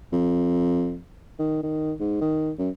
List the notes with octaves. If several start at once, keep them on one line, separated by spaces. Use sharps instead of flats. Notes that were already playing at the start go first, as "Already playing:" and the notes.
F2
D#3
D#3
G#2
D#3
F#2